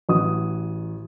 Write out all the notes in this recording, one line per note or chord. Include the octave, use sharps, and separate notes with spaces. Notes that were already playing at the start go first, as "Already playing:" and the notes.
A1 F#4 D#6